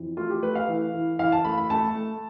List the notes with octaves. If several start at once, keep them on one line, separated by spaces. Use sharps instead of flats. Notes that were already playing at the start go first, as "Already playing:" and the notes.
Already playing: F2 E3
A3 F4
G4
A3 B4
F5
E3
E3
E3 F5
A5
A3 B5
B5
A3 A5
A3